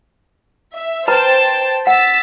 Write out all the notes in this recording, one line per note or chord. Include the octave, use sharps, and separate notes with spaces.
E5
B4 C5 G5 A5 A#5
F#5 E6 A6 B6